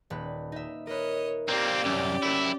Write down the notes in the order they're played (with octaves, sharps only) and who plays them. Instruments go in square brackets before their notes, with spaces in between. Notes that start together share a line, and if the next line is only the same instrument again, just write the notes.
[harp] D#1 B4
D#4 E5
[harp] A#4 B4 [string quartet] C#5 D#5
[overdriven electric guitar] A#3 C4 [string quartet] G4 D5
[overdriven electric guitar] C2 F#2 [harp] C#4
[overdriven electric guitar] F#2 E4